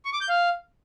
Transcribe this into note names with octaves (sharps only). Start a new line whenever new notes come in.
C#6
D6
G6
F5